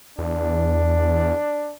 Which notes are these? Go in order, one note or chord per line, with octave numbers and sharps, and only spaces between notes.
E2 D4